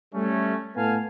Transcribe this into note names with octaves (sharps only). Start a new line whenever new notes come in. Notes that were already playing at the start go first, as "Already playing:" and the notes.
G3 A3 C#4
A2 B3 A4 F5 G#5 A5